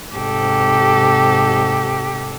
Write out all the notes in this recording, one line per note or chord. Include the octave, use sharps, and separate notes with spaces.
G#2 C3 G4 A4